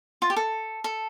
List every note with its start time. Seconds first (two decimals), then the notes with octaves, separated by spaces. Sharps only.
0.22 F4
0.30 G4
0.36 A4
0.84 A4